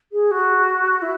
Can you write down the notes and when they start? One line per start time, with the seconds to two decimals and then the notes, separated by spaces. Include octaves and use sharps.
0.12 G#4
0.31 F#4
1.02 E4